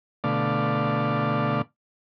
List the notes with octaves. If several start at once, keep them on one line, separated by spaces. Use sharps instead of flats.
B2 D3 A3 D5 F5